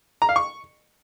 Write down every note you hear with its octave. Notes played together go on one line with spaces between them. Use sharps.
A#5
F5
C#6